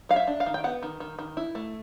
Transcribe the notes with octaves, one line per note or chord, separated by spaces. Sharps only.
F#3 F5
E5
D4
F5
D#3
G5
B3 F#5
D#3
D#3
D#3
E4
A3